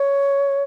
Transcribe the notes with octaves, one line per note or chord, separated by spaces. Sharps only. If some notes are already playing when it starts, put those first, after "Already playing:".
Already playing: C#5